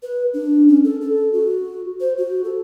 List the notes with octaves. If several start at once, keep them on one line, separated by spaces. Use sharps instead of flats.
B4
D4
C#4
A4
A4
F#4
C5
F#4
A4